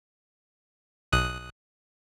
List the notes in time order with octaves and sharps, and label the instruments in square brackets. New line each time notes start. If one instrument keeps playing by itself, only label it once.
[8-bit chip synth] B1 D#6 F#6